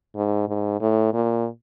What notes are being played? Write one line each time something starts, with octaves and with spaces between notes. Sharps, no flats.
G#2
G#2
A2
A#2